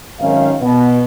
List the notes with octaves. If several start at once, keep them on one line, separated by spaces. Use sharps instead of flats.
G#1 F#2 D#3 C#4 F5
B2